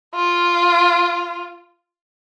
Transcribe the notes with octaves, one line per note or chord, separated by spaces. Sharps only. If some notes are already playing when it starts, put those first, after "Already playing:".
F4